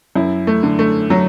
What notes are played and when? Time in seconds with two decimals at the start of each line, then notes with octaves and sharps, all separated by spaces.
0.15 F#2 E4
0.47 A3
0.63 D3
0.79 A3
1.10 F#3